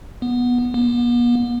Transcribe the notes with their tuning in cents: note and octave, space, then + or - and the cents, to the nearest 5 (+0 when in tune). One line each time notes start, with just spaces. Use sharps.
B3 -10
B3 -45